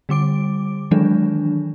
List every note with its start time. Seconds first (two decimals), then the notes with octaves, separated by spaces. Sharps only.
0.09 D3 G3 D6 D7
0.91 D#3 E3 F#3 G#3 D4